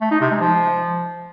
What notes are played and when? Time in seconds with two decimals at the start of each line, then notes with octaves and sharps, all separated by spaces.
0.01 A3
0.11 D#4
0.21 C3
0.31 G#3
0.41 F3